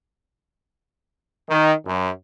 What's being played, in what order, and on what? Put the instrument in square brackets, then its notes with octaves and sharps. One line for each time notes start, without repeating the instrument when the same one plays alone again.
[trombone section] D#3
F#2